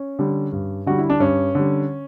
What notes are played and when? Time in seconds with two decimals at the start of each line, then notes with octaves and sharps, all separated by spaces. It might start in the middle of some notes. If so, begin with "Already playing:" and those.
Already playing: C#4
0.19 D3 G3
0.52 G2
0.86 D3 G3 F#4
0.98 E4
1.10 D4
1.20 G2 C#4
1.55 D3 G3